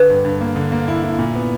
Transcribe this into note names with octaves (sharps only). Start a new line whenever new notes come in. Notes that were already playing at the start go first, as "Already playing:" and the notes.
Already playing: D3 B4
G2
G2
A#3
D3
A#3
E4
E4
A#2
B3